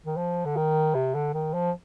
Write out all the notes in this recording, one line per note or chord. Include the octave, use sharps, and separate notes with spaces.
D#3
F3
D3
D#3
C3
D3
D#3
F3